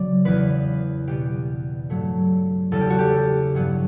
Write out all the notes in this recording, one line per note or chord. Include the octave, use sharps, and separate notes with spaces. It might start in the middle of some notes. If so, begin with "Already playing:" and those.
Already playing: C#3 F#3 D5
E2 C#3 E3 B3 B4
B2 G3 B3 G4
G2 F#3 A3
E2 C#3 G3 A4
G4
F#4
G4
G2 F#3 B3